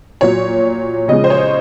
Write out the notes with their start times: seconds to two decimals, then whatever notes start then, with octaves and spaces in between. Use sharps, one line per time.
0.21 A#2 F#3 C#5
1.08 C#3 F3 G#3 D#5
1.24 C5
1.30 C#5